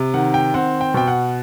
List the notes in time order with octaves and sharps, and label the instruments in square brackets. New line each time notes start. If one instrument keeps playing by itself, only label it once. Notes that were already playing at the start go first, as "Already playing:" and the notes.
Already playing: [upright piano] C3
D#3 F#5
G5
C4 F#5
G5
B2 G5
F#5